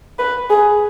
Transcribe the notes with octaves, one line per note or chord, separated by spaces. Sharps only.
B4
G#4